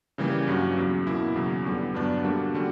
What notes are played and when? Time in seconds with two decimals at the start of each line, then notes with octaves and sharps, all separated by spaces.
0.18 C#3 E3 G3 A#3
0.48 G2 F#3 A#3 C#4 F#4
0.77 E2 C#3 F#3
1.07 B2 A#3 E4
1.36 E2 C#3 F#3
1.65 E2 D3 G3 B3
1.94 G2 F#3 B3 D4
2.24 D3 G3 A#3 D4 F#4
2.54 D3 G3 C#4 F#4